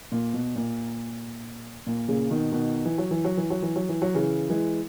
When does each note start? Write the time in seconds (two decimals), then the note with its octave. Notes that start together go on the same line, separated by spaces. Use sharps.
0.12 A#2
0.34 B2
0.56 A#2
1.87 A#2
2.08 A#2 C#3
2.30 B2 D#3
2.52 B2 D#3
2.85 E3
2.98 F#3
3.11 E3
3.24 F#3
3.37 E3
3.50 F#3
3.62 E3
3.76 F#3
3.89 E3
4.02 F#3
4.14 C#3 E3
4.50 E3 G#3